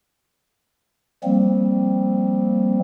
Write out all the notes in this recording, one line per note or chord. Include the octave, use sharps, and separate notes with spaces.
F3 G3 A#3 C4